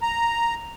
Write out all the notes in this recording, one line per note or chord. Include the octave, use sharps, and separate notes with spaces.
A#5